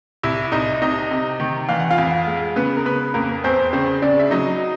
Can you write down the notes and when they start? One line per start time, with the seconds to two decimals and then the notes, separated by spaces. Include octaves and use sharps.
0.23 C2 E4 E5
0.52 C2 D#4 D#5
0.82 C3 D#4 D#5
1.11 C3
1.40 D#3
1.69 E3 F5
1.80 F#5
1.91 F4 F5
1.98 F2
2.27 G#3
2.56 C#3 B3 B4
2.77 A#4
2.85 C#3 B3 B4
3.14 F2 A#3 A#4
3.44 E2 C4 C5
3.73 C#3 C4 C5
4.02 C#3 D4 D5
4.19 E5
4.31 F#3 D#4 D#5